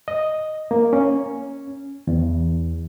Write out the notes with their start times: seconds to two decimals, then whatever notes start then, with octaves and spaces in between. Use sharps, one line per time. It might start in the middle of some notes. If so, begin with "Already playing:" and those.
0.08 D#5
0.71 A#3
0.93 C#4
2.07 E2